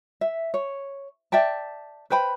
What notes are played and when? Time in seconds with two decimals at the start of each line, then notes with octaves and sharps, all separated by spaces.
0.21 E5
0.54 C#5
1.32 D5 E5 G5 A5
2.10 B4 C5 G5 B5